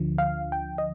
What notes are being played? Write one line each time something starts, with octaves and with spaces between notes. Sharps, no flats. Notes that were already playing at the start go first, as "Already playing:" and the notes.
Already playing: D2 D3 F3
F5
G5
D#5